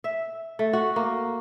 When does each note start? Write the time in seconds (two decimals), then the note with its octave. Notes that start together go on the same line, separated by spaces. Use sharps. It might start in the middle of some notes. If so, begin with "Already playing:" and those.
0.04 E5
0.59 A3
0.73 F#4
0.96 A#3